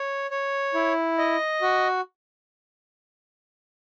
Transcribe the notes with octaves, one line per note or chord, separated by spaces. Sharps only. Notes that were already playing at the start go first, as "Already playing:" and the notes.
Already playing: C#5
C#5
E4
D#5
F#4